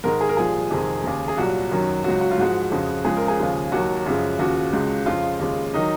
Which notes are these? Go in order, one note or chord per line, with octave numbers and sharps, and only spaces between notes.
G#2 D#3 G#3 A#4
G#4
A#4
C2 A#2 F3 G#3 G#4
F2 C3 D#3 G#3
D#2 C#3 G#3
G#4
C2 A#2 F#3 F#4
F#2 D#3 F#3
C#2 C#3 F#3 F#4
F#4
F4
G#2 F3 G#3 F#4
F2 C#3 G#3
C#2 C#3 F3 G#3 G#4
A#4
G#4
D#2 C#3 F3 G#3
D#2 D#3 F#3 F#4
F#2 C#3 F3 G#3
D#2 C#3 F3 F#4
C#2 C#3 G#3
F2 C#3 G#3 F4
D#2 C#3 G#3
D#3 F#3 D#4